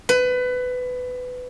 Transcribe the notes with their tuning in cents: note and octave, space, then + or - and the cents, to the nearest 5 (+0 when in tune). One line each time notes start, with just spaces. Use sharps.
B4 +20